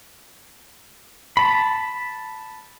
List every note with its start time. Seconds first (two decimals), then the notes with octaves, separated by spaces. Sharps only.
1.37 A5 B5